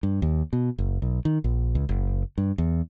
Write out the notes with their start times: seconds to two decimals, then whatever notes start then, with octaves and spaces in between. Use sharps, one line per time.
0.03 G2
0.22 D#2
0.53 B2
0.78 F#1
1.02 B1
1.25 D#3
1.44 A#1
1.75 C#2
1.89 F#1
2.38 G2
2.58 E2